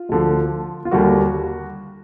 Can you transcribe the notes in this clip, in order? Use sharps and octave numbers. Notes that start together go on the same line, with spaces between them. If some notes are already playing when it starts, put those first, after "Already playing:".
Already playing: F4
D2 D3 F3
F4
D#2 D3 G3 A#3 F#4